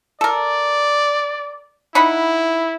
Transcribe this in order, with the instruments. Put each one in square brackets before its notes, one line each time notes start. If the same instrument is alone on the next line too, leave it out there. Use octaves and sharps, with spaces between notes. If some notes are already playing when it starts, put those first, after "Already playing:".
[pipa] A4 A#4 [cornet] D5
[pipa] D#4 F#5 B5 [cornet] E4